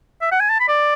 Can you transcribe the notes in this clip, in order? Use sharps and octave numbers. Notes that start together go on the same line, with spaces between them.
E5
F#5
G#5
A5
B5
D5